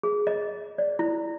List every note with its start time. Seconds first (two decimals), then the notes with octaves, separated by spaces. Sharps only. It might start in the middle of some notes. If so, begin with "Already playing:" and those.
0.03 G#4
0.27 D#5
0.78 D5
0.99 E4